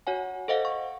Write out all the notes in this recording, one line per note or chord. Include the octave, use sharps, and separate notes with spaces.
F#4 C#5 F#5 G#5
A4 C5 D#5 F5 F#5
C#6